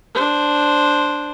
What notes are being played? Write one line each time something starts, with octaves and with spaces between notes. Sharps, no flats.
D4 C5